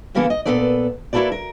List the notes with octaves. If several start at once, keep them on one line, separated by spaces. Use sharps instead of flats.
D2 C#3 E3 A#3 B3 A4
D#5
A#2 C#3 B3 A4 B4 D5
A#3 E4 F#4 A4 B4 D5
A#4